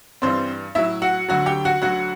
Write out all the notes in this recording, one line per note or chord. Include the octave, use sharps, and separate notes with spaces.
G2 E3 G3 C4 C5
A2 F#3 E4 E5
F#4 F#5
D2 D3 F#3 F#4 F#5
G4 G5
F#4 F#5
D2 D3 F#3 F#4 F#5